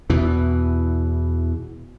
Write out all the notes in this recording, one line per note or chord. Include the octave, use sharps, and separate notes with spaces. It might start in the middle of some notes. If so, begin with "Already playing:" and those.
E2 B2 E3